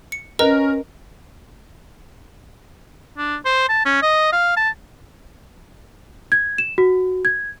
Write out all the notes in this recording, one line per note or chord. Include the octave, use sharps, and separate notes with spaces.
C#7
C#4 A#4 B4 D#5 A#5
D4
C5
A5
C#4
D#5
F5
A5
G#6
E7
F#4
G#6